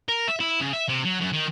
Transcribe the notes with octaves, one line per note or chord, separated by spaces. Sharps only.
A#4
E5
E4
C#3
E5
C3
F#3
F#2
D#3